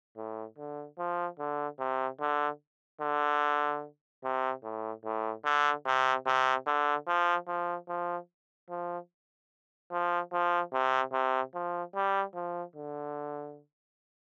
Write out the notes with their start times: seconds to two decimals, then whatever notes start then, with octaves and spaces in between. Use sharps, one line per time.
0.17 A2
0.58 D3
0.99 F3
1.39 D3
1.79 C3
2.20 D3
3.01 D3
4.24 C3
4.63 A2
5.05 A2
5.45 D3
5.86 C3
6.26 C3
6.67 D3
7.07 F3
7.48 F3
7.88 F3
8.70 F3
9.91 F3
10.32 F3
10.73 C3
11.13 C3
11.54 F3
11.95 G3
12.35 F3
12.76 D3